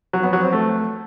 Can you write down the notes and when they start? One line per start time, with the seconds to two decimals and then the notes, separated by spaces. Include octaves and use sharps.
0.13 F#3
0.23 B3
0.33 F#3
0.43 C4
0.53 A3